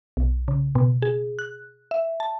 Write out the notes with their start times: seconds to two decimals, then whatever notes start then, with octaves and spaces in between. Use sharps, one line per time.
0.17 B1
0.48 C#3
0.75 B2
1.02 G#4
1.39 F#6
1.91 E5
2.20 A5